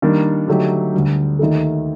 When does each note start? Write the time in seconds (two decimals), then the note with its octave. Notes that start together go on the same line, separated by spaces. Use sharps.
0.02 D#3 G3 A#3 D4
0.48 D3 F#3 A3 D#4 G4
0.94 D2 D3 G3
1.39 D#2 D#3 A3 D#4 A4